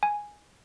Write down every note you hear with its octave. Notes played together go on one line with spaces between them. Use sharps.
G#5